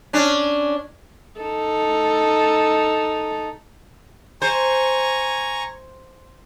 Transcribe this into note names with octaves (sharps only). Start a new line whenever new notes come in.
C#4 D4
D#4 A4
C5 G#5 A#5 C#6